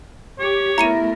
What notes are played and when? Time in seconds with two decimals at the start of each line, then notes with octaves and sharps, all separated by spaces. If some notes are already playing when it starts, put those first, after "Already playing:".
0.39 G4 C#5
0.78 A3 B3 E4 A#4 A#5 C#7 D#7